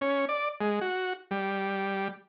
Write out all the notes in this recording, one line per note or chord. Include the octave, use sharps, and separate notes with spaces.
C#4
D5
G#3
F#4
G3